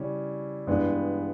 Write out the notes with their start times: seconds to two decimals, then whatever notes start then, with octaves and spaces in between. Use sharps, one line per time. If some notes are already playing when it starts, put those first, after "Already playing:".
Already playing: C#3 G3 C#4 E4
0.67 G2 E3 G#3 B3